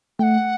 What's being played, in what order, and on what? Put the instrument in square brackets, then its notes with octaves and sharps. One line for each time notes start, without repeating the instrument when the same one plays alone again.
[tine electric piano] A3 [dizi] F#5 G5